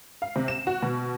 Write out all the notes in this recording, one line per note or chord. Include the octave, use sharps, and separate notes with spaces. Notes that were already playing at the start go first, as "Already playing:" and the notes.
F5
C3
E7
F#4
B2